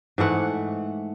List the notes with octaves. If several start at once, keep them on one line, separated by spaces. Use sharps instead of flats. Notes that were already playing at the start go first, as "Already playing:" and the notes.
G#2 E3 A3 F#5